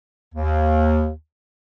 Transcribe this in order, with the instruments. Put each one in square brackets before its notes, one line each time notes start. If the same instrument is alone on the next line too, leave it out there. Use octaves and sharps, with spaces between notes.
[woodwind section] D#2